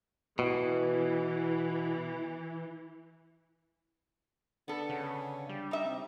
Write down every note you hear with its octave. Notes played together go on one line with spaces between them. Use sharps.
B2 E3
D3 B3 A4
C#3
G3
D#4 E5
C3